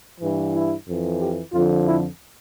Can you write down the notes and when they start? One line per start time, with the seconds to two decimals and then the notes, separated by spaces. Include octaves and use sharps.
0.20 G2 E3
0.54 E4
0.87 F2 E3
1.19 G4
1.53 F2 D3 F3 F4
1.86 E4